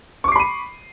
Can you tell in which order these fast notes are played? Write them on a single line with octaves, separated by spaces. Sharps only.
C#6 D6 C7 B5 D#7